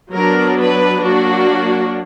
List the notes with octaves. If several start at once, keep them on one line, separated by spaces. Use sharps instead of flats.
F#3 B3 D4 A#4
B4
F#3 A#3 D4 F#4